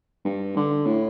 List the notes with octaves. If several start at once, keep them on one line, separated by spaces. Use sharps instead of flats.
G2
D3
A2